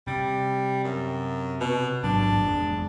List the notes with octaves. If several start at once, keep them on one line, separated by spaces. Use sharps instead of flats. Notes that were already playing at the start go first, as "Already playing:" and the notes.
C3 G3
F#2
B2
A1 G#2 F#3 D4
F1 G#3